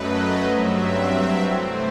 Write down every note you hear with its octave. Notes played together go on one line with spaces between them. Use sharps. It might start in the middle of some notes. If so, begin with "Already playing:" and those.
Already playing: F#2 F#3 A3 B4 D#5
G2 F#3 C4 E5
C3 E3 A3 C4 C5